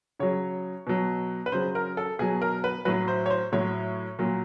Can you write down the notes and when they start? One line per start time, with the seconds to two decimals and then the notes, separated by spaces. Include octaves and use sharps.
0.20 C#3 F#3 C#5
0.87 B2 F#3
1.46 B4
1.52 C#3 F#3 C5
1.75 A#4
1.97 A4
2.19 B2 F#3 G#4
2.42 A#4
2.64 B4
2.85 A2 F#3 B4
3.08 C5
3.26 C#5
3.30 C5
3.52 A2 F#3 C#5
4.19 A#2 F#3